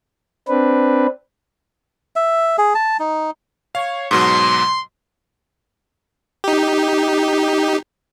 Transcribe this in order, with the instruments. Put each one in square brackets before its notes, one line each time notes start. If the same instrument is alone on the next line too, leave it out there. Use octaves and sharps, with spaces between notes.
[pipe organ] C4 D4 B4
[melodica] E5
G#4
A5
D#4
[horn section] C#5 [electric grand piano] F5
[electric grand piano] G#2 B2 F#3 [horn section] C6
[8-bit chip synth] D#4 G4